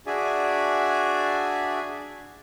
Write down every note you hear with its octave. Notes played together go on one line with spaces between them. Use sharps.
D4 F#4 G#4 D5 E5 G#5